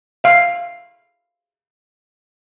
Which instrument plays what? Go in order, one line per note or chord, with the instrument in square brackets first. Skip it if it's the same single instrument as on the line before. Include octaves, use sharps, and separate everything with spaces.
[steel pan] E5 F5